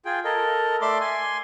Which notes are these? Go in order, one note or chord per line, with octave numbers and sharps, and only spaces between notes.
F4 G#4 G5
A4 A#4 D#5
A3 D5 E5 C6 D6
G#5 C6